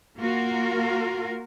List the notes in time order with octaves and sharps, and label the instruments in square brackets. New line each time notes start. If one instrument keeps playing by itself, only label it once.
[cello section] A#3 F4 F#4 A#4